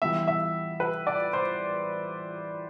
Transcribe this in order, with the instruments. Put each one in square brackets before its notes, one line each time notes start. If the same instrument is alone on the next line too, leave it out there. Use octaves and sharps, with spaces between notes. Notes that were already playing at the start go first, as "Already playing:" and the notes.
[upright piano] E3 G3 B3 E5
E5
B4
D5
C5